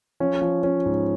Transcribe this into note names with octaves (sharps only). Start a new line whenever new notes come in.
F3 C#4
F3
F3 C#4
G#2